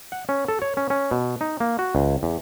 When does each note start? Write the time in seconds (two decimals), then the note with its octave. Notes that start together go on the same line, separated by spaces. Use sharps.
0.12 F#5
0.29 C#4
0.48 A4
0.62 C#5
0.77 C#4
0.90 C#4
1.11 B2
1.41 D#4
1.60 A#3
1.79 F#4
1.95 C#2
2.23 E2